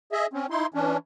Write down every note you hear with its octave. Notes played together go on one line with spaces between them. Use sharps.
G#4 D#5 E5
C4 C#4
D#4 E4 C6
E3 C#4 D4